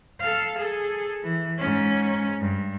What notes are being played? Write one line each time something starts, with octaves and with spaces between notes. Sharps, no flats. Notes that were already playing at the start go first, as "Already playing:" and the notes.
A4 F5
G#4 A4
E3
G#2 C#4
G2